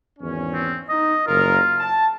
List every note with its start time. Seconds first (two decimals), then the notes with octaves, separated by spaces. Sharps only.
0.19 G#1 E2 C#4
0.52 C4
0.89 D#4 D#5
1.27 F#1 F4 A#4
1.79 A5